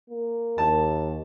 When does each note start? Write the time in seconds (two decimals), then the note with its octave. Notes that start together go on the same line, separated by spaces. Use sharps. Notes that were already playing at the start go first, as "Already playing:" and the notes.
0.10 A#3
0.58 D#2 A5